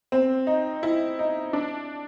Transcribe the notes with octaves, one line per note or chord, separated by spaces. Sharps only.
C4
D#4
E4
D#4
D4